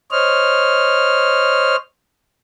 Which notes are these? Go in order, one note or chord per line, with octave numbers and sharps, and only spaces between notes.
C5 C#5 D#5 F6